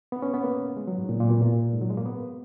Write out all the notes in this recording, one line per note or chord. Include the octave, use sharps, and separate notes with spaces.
B3
C#4
B3
A#3
G#3
F#3
G#2
A#2
A#2
B2
A#2
G#2
F#3
G#3
A#3
B3